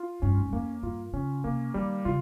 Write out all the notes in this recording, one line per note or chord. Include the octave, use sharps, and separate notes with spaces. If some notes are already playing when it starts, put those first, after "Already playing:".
Already playing: F4
G2 C#4
G#2
G2
F2 A#3
G2 F4
C#3 C#4
C3 A#3
D#3 G3
C#3 F4